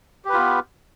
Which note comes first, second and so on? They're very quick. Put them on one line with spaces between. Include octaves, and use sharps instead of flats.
G4 B4 F4 B3